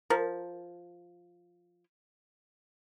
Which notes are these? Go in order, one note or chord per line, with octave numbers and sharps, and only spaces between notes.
F3 A#4